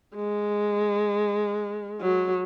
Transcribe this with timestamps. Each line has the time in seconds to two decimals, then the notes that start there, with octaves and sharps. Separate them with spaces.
0.15 G#3
2.01 F#3